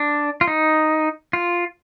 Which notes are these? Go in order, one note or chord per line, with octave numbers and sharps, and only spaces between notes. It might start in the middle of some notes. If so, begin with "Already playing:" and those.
Already playing: D4
F4
D#4
F4